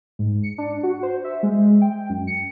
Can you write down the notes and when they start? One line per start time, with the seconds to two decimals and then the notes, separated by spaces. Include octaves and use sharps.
0.19 G#2
0.43 C#7
0.58 D4
0.83 F#4
1.03 C5
1.24 E5
1.43 G#3
1.81 G5
2.09 F#2
2.27 C#7